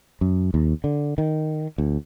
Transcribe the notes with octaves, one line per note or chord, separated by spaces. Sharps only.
F#2
D#2
D3
D#3
D2